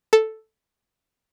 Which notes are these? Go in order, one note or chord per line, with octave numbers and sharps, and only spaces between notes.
A4